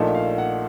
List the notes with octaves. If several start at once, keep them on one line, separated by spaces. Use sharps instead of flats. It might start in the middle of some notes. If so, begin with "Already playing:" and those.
Already playing: A#1 A#2 A3 D#4 A5
F5
F#5